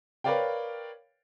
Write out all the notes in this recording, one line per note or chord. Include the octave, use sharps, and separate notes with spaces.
A#4 B4 C#5 D5 F5 G5